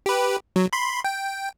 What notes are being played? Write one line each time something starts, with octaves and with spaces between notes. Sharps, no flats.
G4 B4
F#3
B5 C6
G5